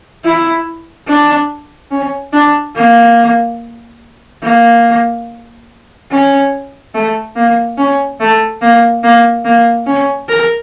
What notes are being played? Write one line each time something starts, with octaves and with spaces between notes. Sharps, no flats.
E4
D4
C#4
D4
A#3
A#3
C#4
A3
A#3
C#4
A3
A#3
A#3
A#3
C#4
A#4